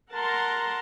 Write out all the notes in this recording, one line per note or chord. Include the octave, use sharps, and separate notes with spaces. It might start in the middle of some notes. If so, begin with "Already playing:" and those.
A#4 F#5 A5 A#5 C6